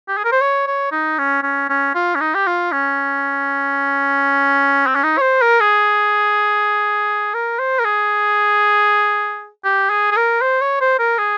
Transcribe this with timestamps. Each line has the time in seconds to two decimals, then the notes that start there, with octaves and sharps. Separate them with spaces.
0.08 G4
0.17 G#4
0.24 A#4
0.32 C5
0.42 C#5
0.67 C#5
0.92 D#4
1.19 C#4
1.43 C#4
1.69 C#4
1.95 F4
2.15 C#4
2.21 D#4
2.35 G4
2.47 F4
2.72 C#4
4.87 C4
4.95 C#4
5.03 D#4
5.18 C#5
5.22 C5
5.41 A#4
5.60 G#4
7.34 A#4
7.59 C5
7.79 A#4
7.85 G#4
9.65 G4
9.90 G#4
10.12 G#4
10.17 A#4
10.41 C5
10.61 C#5
10.81 C5
10.99 A#4
11.18 G#4